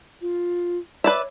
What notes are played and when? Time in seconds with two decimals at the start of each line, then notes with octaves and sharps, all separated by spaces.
0.22 F4
1.04 B4 C#5 D5 E5